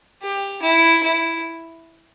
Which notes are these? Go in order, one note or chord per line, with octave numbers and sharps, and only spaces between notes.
G4
E4
E4